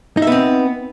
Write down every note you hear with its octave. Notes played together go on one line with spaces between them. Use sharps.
B3 C4 D#4 E5